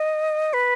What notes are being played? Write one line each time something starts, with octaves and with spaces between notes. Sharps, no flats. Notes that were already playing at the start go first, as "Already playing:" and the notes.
Already playing: D#5
B4